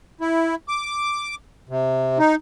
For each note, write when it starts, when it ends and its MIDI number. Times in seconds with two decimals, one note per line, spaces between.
0.21 0.55 64
0.68 1.35 86
1.69 2.18 48
2.19 2.35 63